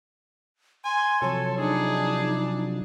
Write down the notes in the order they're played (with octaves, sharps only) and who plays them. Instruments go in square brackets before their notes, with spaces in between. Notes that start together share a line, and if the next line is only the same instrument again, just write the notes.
[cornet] G#5 [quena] C6
[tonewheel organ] C3 F3 F#3 [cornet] A4 [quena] C#5
[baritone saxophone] D4 [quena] D#4 [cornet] G#4